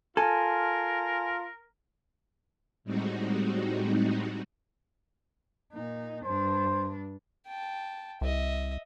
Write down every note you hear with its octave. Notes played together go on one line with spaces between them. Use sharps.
F4 A4 A#4 G#5
A2 G3 G#3 C4 D#4 F#4
A#2 D#4
G2 D4 C5
G5 A5
C2 D#5 E5